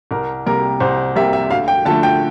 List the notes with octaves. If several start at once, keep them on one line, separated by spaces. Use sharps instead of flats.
C2 A#4
C3 G3 A#3 A#4
C2 C5
C3 G3 A#3 E5
E5
D2 F5
G5
D3 F3 A3 A5
G5